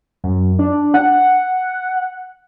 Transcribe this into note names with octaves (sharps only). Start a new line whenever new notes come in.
F#2
D4
F#5